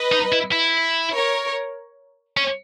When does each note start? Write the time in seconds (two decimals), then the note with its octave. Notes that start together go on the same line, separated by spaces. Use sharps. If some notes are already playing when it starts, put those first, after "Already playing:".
Already playing: B4 D#5
0.12 D#4
0.32 E4
0.52 E4
1.13 A#4 C#5
2.37 C#4